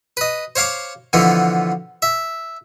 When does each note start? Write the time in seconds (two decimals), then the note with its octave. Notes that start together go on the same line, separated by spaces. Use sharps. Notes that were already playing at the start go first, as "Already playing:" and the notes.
0.17 B4 D#5
0.56 C5 C#5 F5 C6 D6
1.13 B2 D3 E3 F3 B3
2.02 E5